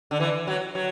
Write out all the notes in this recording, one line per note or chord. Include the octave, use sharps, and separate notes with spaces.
D3
E3
F#3
F#3